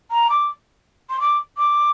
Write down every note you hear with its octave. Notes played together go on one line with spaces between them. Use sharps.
A#5
D6
C6
D6
D6